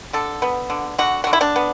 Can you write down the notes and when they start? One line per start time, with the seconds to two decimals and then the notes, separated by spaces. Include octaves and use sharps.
0.13 D3 A4
0.42 B3
0.70 D3
0.98 D3 F#4
1.24 D3 F#4
1.33 E4
1.41 D4
1.56 B3